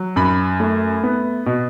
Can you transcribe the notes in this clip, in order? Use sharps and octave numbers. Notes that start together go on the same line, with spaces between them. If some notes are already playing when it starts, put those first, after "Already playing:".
Already playing: F#3
F#2 B5
A3
B3
B2